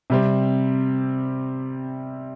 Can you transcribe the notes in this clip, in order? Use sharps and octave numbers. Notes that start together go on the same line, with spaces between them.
C3 G3 C4